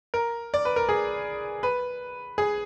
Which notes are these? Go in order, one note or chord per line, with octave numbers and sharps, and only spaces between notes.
A#4
D5
B4
A#4
G#4
B4
G#4